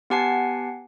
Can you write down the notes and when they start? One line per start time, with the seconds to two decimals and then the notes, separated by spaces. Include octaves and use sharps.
0.10 B3 G4 F#5 G#5 A5 C7